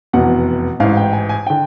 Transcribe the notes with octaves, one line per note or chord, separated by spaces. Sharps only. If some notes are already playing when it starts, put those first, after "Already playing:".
F1 E2 B2 F#5
A1 G#2 E3 F5
G5
G#5
G#5
D3 G5